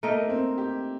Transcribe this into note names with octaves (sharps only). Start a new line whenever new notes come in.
A3 A#3 D#4 A#4 D#5
A#3
C4
G4